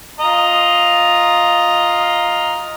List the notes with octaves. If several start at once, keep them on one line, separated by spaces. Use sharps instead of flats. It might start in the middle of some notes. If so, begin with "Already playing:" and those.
F4 D#5 A#5